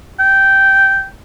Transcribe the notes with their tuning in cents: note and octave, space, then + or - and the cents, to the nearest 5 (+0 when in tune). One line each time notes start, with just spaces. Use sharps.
G5 -10